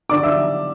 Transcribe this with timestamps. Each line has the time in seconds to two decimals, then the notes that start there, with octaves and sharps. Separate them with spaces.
0.09 D3 D5 D6
0.23 E5 E6